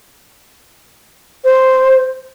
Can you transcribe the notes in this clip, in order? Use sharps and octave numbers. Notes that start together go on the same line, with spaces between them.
C5